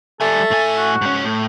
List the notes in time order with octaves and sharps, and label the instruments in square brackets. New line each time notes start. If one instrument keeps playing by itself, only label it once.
[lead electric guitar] G3 G#5 [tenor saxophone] A3 [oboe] A4
[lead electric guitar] A2 G#5
[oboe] F#4
[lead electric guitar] G#2 C#4
A2